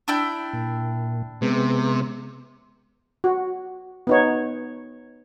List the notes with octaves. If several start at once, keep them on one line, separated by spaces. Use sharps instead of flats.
D4 E4 G5
A#2
C3 G#3 B3
F#4
B3 D#4 C#5